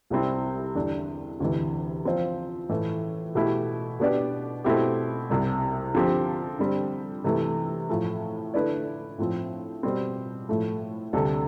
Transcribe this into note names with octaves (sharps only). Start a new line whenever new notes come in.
C2 C3 G3 C4 E4
E2 D3 G3 D4
D2 C3 E3
F3 C4 F4 C5
A2 E3 A3
B2 A3 E4 G4
B2 B3 D4 G4 D5
B2 A3 C4 E4 G4
C2 C3 G3
D3 F3 C4 G4
D3 G3 C4
C3 E3 A3
A2 F3 A3
D3 A3 E4 B4 D5
A2 F3 C4
B2 G3 C4
A2 F3 A3
D2 C3 G3 D4 A4